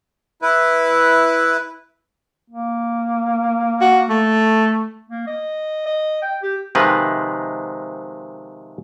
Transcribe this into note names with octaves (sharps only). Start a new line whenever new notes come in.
E4 B4
A#3
F#4
A3
A#3
D#5
D#5
G5
G4
C3 D#3 F3 G#3 B4